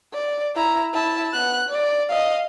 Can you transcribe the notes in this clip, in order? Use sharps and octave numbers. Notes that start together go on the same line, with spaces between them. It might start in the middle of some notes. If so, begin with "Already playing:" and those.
D5
E4 A#5
E4 A5
B3 F#6
D5
D#5 F5